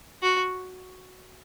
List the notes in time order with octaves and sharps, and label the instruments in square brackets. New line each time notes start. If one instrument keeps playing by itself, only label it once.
[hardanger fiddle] F#4